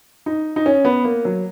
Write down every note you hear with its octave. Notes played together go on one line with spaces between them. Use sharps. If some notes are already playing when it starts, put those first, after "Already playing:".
D#4
D#4
C#4
B3
A#3
F#3